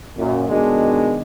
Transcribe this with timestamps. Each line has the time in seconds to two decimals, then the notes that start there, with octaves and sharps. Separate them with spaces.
0.17 F#2 A#2
0.48 B2 D#3 G#3 D4